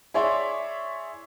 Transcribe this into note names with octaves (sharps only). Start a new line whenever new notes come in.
E4 G#4 C#5 D5 E5 C6